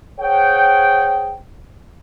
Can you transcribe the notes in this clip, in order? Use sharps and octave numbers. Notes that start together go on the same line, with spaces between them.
G#4 C5 C#5 F#5 G5